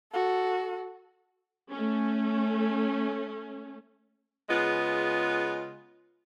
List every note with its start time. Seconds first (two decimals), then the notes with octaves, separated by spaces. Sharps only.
0.12 F#4 A4
1.71 A3 C#4
4.48 C#3 G#3 B3 F4